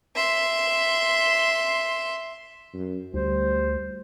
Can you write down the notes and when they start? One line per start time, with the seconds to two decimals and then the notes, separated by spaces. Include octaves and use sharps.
0.16 E5 C6
2.74 F#2
3.14 D2 G3 C5